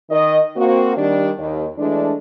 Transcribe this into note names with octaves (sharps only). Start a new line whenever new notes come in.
D#3 D#5
A#3 C4 F#4
D#3 G3 D4
D#2
E3 G#3 A3 D4